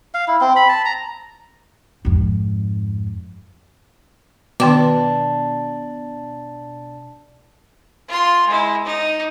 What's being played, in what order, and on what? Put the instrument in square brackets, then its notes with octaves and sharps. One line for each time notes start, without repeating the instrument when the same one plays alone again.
[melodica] F5
E4
C4
B5
A5
A#5
[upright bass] F2 G#2
[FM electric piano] B2 [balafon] D#3 G5 D6 [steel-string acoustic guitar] D4
[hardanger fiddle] F4 C6
G#3 E4
D#4